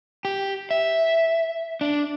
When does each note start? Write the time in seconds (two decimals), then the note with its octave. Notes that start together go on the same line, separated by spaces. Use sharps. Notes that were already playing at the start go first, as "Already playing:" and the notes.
0.25 G4
0.71 E5
1.81 D4